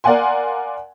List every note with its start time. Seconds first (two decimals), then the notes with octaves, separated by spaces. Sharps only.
0.04 A#4 D5 F5 F#5 G#5 C6